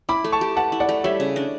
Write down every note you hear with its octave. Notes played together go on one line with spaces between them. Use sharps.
E4 B5 D6
A3
A5 C#6
G4
B4 F#5 A5
E4
D5 F#5
A3
G3 C#5 E5
C#3
D4